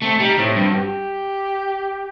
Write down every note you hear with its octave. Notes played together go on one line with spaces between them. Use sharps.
A3 C4
G3 D#4
A2 C4
G2 C4
F#4
G4